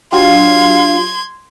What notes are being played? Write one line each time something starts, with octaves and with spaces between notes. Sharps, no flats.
F#3 D4 F4 G4 F5 C6 G#6